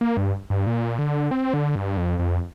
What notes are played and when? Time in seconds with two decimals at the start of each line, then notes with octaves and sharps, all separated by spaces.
0.01 A#3
0.17 G2
0.50 G2
0.67 A#2
0.99 D3
1.31 C4
1.54 D3
1.75 G2
1.97 F2
2.19 F2